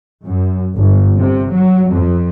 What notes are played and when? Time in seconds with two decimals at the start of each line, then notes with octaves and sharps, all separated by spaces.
0.25 F#2
0.75 G1
1.17 C3
1.51 F#3
1.92 F2